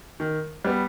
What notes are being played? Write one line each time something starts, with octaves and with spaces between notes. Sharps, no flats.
D#3
G3 B3